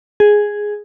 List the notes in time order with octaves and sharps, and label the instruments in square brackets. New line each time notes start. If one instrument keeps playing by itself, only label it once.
[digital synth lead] G#4